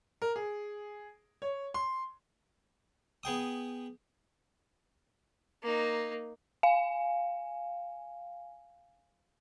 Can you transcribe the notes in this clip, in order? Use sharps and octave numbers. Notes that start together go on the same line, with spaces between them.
A#4
G#4
C#5
C6
B3 G#4 G5 D#6
A#3 D#4
F5 G#5